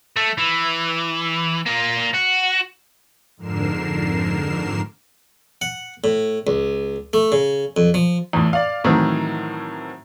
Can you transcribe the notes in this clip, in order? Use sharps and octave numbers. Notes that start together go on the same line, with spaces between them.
A3
E3
A#3 F4
F#4
F2 G#2 D3 A#4 C7 E7
F#5
A2
C#2
A3
C#3
F2
F3
E2 A2
D5 F5
A2 D#3 E3 F#3 C4